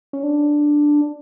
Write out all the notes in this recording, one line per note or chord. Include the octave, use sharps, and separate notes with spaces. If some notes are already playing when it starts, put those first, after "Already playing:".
C#4
D4